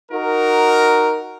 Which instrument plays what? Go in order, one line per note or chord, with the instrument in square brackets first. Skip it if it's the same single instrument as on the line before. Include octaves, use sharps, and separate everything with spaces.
[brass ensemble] D#4 F#4 A#4